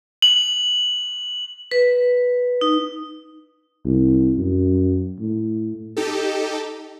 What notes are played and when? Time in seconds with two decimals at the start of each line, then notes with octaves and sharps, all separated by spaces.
0.22 F#7
1.71 B4
2.61 D#4
3.85 C2
4.37 F#2
5.19 A2
5.97 D#4 G4 A4